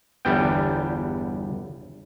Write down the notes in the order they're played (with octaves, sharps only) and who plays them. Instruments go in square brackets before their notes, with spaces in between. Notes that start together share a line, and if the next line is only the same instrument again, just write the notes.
[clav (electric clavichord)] G1 E2 G3 B3 G5